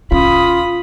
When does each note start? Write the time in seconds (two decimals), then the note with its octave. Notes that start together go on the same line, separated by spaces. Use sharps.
0.12 E1 C#4 F4 B5 D#6